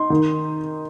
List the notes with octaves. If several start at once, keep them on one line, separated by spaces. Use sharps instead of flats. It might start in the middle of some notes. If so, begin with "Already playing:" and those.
Already playing: D#4 C6
D#3